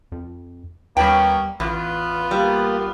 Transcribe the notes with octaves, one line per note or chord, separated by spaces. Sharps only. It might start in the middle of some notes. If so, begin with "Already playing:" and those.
F2
D#2 G3 A#3 B3 C#4 G5
A1 E2 B3 F4
G3 A#3